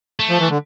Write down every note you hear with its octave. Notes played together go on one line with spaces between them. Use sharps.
A3
F3
E3
D3